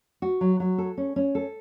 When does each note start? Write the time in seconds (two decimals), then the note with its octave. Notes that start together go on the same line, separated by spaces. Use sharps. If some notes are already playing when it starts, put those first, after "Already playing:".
0.22 F#4
0.41 F#3
0.60 F#3
0.78 A4
0.97 C#4
1.16 C#4
1.35 A4